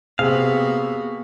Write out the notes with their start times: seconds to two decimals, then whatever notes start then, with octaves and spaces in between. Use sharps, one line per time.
0.19 C3 A#3 B3 F#4 G#4 F5